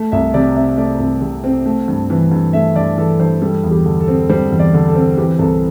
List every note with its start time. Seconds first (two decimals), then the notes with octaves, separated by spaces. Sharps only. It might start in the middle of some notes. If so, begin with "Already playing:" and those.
Already playing: A3
0.12 C2 E5
0.34 C3 D5
0.56 C4 E5
0.78 A3 D5
1.00 C2
1.21 C3
1.44 C4
1.66 A3
1.88 G2
2.10 E3
2.31 G2
2.53 A3 E5
2.76 G2 D5
2.98 E3 A4
3.20 G2 C5
3.42 G3 A4
3.64 E2
3.71 G4
3.86 D3
4.00 A4
4.08 C4
4.30 G3 C5
4.51 E2
4.59 D5
4.74 D3
4.88 A4
4.95 C4
5.17 E3 G4
5.39 C2 A4